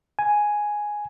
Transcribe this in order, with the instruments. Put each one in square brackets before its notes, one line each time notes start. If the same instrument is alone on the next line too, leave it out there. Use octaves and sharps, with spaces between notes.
[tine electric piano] G#5